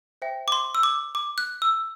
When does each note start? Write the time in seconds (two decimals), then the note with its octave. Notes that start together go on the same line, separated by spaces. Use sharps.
0.22 C5 E5 G5
0.48 D6
0.52 C6
0.75 E6
0.83 D6
1.15 D6
1.38 F#6
1.62 E6